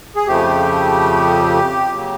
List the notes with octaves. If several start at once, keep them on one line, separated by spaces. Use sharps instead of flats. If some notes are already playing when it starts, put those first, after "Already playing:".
G#4
F2 C#3 F3 A3 G4
C#3 F#3 A#3